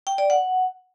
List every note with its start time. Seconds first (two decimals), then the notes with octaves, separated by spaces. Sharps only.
0.07 G5
0.18 D5
0.30 F#5